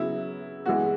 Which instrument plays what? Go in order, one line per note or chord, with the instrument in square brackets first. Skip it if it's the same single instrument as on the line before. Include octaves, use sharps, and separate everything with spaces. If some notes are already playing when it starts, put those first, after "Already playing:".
Already playing: [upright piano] C#3 F#3 B3 [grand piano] E4
[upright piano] E3 G#3 B3 [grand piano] F#4